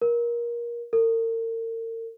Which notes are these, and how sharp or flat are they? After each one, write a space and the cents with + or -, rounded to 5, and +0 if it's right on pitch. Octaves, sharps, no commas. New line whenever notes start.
A#4 +25
A#4 -40